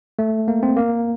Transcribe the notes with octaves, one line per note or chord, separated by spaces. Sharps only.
A3
A#3
C4
A#3